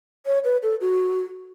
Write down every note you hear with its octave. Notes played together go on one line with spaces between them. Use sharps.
C#5
B4
A4
F#4